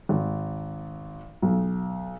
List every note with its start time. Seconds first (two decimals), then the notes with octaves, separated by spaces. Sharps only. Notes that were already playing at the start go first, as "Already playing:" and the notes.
0.09 G#1
1.42 B1